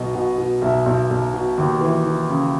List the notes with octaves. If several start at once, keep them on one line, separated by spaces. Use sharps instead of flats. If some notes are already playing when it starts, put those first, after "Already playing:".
Already playing: B1 B2 D#5
B2
B2
B1 E5
B1
B1
B2
D#2
E3
E3
C#3